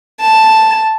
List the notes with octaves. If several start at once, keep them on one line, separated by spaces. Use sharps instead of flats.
A5